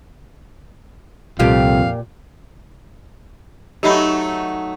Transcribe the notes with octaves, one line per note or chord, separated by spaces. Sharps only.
C2 F2 A#2 G4 F5
F#3 A3 D#4 G4 D#5 B5